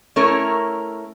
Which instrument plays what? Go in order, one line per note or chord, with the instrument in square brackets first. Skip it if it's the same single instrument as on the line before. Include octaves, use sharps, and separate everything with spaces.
[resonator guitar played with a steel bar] A3 C#4 E4 A#4 C#5